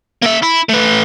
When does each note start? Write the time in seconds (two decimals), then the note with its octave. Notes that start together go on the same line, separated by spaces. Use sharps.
0.23 A#3 E5
0.43 E4
0.70 A3 B4